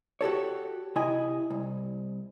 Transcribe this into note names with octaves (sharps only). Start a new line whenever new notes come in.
F#4 G4 A4 C#5
C3 E4 D#5 G#5
C2